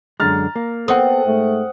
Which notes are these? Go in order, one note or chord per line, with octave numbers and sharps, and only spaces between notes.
F#2 D3 G#3 A#5 F6 A6
A#3
B3 C4 A4 F#5 D#6
G#2 A3